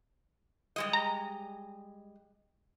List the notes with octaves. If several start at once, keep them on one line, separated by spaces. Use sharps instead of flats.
G3 G#3 D#5
A#5